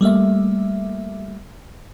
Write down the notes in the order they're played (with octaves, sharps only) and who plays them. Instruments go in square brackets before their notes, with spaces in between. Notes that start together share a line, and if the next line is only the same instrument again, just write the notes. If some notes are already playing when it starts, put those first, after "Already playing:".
[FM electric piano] G3 A3 A#3 E5